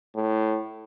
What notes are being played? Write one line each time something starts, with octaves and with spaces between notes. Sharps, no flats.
A2